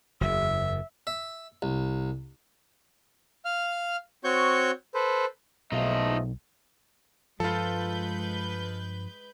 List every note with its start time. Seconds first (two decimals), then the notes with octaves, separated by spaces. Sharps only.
0.21 F#1 E2 E5
1.07 E5
1.62 C2
3.45 F5 F6
4.24 C4 F#4 C#5 C#6 G6
4.94 A4 B4 C5
5.72 B1 E2 F3 A3 D#4 F4 D#5
7.40 G2 F3 G#3 F4 A4 B4 G6